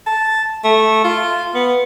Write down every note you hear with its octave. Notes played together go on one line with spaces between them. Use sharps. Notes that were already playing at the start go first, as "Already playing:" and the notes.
A5
A3
F4
B3